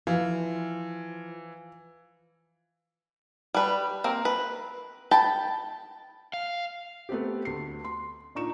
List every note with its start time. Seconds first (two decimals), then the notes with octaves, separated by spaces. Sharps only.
0.07 E3 F3 F5
3.54 G3 B4
4.04 A#3 C4
4.25 B4
5.11 G5 A5 B5
6.33 F5
7.09 A3 B3 C4 G4
7.45 D2 C7
7.84 C6
8.35 A#2 D4 D#4 C#6 E7